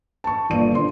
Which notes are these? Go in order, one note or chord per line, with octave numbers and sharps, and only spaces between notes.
A5 C#6
G1 A#2 D5 D#7
C4 D4 C6